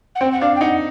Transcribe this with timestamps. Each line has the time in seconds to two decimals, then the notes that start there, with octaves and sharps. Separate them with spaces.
0.15 F#5
0.20 C4 G5
0.32 F#5
0.40 D4 F5
0.55 G5
0.61 D#4 F#5